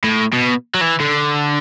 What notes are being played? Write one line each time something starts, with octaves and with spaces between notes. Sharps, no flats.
A2
B2
F#3
E3
D3